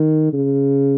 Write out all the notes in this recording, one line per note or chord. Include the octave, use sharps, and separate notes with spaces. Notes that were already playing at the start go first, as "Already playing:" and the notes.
Already playing: D#3
C#3